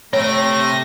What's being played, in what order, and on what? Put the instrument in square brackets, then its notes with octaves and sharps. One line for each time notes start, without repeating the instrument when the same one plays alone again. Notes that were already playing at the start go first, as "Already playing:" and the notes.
[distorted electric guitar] C3 G5 [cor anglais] A3 [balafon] C#5 [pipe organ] A#6